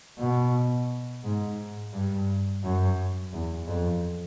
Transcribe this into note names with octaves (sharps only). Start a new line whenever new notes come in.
B2
G#2
G2
F#2
E2
F2